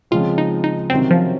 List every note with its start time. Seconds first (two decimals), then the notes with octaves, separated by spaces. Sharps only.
0.11 C#3 F3 G#3 C4 F4
0.38 D#4
0.64 D#4
0.90 C3 D#3 F#3 C4 C#4
1.11 F3